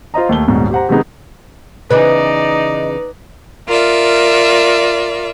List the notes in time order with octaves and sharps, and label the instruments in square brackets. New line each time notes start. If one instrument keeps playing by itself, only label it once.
[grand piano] F4 C5 D#5 A#5
D#2 A3 G7
D#1 A#1 G#2 B2
G4 C5 F#5 A#5
C3 D#3 G#3 B3 D#4 G#4
[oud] C#3 E3 B3 [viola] D#4 D5 [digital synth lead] B4 [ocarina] D#5
[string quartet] F4 A#4 D5 E5